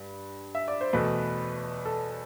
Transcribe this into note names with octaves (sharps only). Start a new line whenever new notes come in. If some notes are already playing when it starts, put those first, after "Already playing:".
Already playing: G2
E5
D5
C5
E2 B2 A3 B4
A4